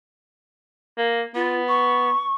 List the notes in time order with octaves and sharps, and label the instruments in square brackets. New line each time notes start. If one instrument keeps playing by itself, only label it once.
[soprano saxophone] A#3
[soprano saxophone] B3 [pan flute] F4
[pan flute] C#6